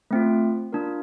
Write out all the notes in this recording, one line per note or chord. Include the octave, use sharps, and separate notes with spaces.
A3 C4 F4
A#3 D4 F4 A#4